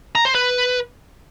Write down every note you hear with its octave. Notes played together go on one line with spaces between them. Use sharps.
A#5
C5
B4